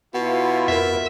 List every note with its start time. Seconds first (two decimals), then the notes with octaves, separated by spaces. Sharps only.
0.14 B2 E4 F4 F#5
0.68 F2 A#4 E5